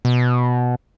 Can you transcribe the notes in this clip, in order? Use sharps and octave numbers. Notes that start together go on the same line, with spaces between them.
B2